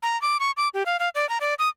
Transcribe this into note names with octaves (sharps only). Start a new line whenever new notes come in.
A#5
D6
C#6
D6
G4
F5
F5
D5
A#5
D5
D#6